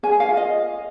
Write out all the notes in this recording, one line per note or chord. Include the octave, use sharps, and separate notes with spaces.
G#4 G#5
F5
F4
D#5